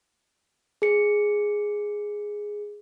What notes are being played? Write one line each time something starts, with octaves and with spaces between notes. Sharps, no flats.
G#4 C#7